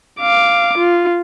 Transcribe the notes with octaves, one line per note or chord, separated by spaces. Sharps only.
F5 D6
F4